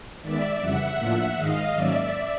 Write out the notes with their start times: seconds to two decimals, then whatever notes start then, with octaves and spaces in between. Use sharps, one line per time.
0.22 D#3 G#3 B3 D5 E5
0.60 F2 C#3 E3 G3 E5 F#5
0.98 A2 F3 A#3 D4 F4
1.36 G#2 D#3 G#3 D#5 F5
1.74 G#2 D#3 F#3 A#3 C#4 D5 E5